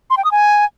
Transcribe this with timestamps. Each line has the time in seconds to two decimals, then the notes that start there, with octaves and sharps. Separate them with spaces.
0.10 C6
0.17 G5
0.24 D#6
0.31 G#5